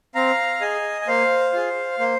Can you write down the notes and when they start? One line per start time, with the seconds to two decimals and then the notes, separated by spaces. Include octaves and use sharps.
0.15 C4 F5 A#5
0.61 G#4 D#5 G#5
1.02 G#5
1.07 A#3 C5 F5
1.53 F4 G#4
1.99 A#3 C5